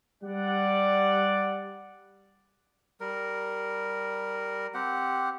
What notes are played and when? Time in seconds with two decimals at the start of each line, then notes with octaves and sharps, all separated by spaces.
0.24 G3 D5 F#5
3.00 G3 A#4
4.74 C4 G4 F#5